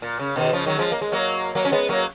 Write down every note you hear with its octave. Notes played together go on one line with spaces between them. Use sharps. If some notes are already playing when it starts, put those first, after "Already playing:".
A#2
C#3
B2 D#3
C#3 F3
D#3 F#3
F3 G#3
A#3
G#3
F#3 A#3
F#3 A#3
C#4
G#3 B3
F#3 A#3